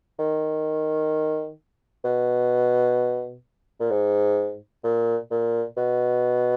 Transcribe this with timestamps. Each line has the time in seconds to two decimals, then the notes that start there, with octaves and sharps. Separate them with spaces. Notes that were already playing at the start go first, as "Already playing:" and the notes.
0.19 D#3
2.04 B2
3.80 A#2
3.90 G#2
4.84 A#2
5.31 A#2
5.77 B2